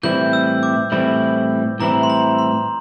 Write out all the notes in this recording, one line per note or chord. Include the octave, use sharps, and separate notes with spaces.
A2 E3 G3 C4 E4 G6
E6
D6
A2 E3 G3 C4 E4
A2 E3 G3 C4 E4 A#5
C6
A#5
C6